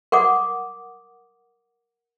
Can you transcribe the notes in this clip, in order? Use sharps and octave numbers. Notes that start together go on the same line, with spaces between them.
A#4 F#5 D6 D#6